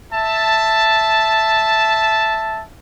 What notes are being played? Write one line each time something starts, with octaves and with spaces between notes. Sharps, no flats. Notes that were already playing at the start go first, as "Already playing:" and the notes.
E5 A5